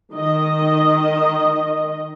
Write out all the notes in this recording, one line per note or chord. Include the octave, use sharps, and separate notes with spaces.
D#3 D#5